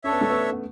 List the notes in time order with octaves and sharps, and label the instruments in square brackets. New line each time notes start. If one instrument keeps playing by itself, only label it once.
[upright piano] C#4 [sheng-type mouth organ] D4 A4 C#5 E5
[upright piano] B3
A3
B3
B3